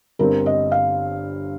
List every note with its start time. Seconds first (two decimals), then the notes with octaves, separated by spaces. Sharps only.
0.19 G1 G2 G3 C4 A#4
0.46 D#5
0.72 F5